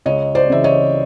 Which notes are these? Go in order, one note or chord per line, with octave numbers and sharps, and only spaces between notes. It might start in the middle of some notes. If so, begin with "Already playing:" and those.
C#2 C#5 D#5
C5 D5
C#3 E3 E5
C#5 D#5